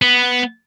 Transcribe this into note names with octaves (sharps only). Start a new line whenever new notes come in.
B3